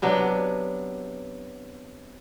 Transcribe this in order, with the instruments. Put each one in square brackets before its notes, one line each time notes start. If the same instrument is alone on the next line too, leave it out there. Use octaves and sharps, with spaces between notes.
[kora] C3 F#3 B3 D4